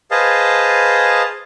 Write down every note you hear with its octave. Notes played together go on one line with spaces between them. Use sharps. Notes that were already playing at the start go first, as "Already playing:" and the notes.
G#4 B4 C5 D#5 F5 A5